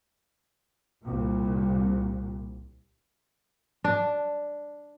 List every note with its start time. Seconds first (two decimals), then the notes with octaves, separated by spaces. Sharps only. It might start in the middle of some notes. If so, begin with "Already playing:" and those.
1.04 C2 A#2
3.84 D4